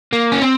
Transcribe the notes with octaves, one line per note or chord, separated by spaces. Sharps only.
A#3
C#4
C4